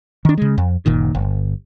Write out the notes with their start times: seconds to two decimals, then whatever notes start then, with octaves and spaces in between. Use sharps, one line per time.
0.25 D#3 D4
0.38 C#3 G#3
0.58 F2
0.86 F#1 A#2 D#3
1.15 G1